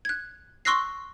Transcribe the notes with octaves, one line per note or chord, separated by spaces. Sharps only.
F#6 G#6
C6 C#6 E6 F#6 A#6 C7